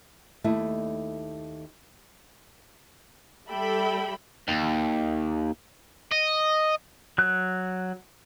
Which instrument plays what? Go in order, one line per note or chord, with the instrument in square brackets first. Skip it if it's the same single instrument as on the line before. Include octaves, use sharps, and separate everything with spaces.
[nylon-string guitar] D#2 A3 D#4 E4
[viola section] G3 A4 E5 G5 B5
[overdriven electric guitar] D#2
D#5
[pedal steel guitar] F#3 F#6